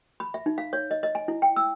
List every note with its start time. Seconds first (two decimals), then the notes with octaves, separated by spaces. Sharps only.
0.20 B5
0.34 E5
0.46 D#4
0.58 F5
0.73 C#5
0.91 D#5
1.03 D#5
1.15 G#5
1.28 E4
1.42 G5
1.56 E6